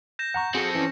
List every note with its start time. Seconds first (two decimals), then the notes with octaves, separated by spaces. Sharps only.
0.19 G6 A#6 E7
0.34 F#5 A#5 C#6
0.54 C4 F#4 G#4 A4 C#7
0.75 E3 C#4